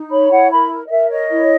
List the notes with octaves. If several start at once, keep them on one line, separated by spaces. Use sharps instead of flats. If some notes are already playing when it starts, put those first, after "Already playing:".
Already playing: D#4
C#5 B5
E4 F#5
A#4 B5
A#4
D#5
A#4 E5
C#5 D#5
E4